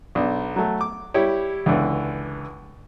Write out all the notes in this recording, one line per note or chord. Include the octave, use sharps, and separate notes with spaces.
B1 D4
F#3 A3
D6
G3 E4 G4 C#5
C#2 D3 E3